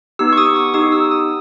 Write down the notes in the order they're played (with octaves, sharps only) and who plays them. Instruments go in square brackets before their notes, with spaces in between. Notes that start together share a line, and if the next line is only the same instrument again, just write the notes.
[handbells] B3 D#4 G4 E6
C#6
D#6
C#6
B3 D#4 G4 D#6
E6
D#6